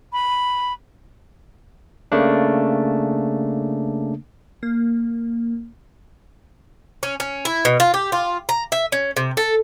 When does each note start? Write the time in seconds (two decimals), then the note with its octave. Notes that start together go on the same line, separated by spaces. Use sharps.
0.13 B5
2.12 C#3 A3 A#3 D4
4.63 A#3
7.03 C#4
7.20 C#4
7.45 E4
7.65 B2
7.80 F4
7.94 G4
8.12 F4
8.49 A#5
8.72 E5
8.92 C#4
9.17 C3
9.37 A4